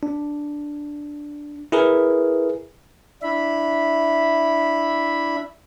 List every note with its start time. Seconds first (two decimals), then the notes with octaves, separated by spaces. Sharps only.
0.03 D4
1.72 E4 G#4 A#4 B4
3.23 D4 E4 E5 B5